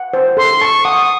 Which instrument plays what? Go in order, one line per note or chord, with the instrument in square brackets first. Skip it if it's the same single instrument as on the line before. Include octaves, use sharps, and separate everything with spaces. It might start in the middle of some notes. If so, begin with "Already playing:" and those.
Already playing: [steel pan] F#5
C5
[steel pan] A4 [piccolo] C6
[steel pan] A5 [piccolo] C#6
[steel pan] F#5 [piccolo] D#6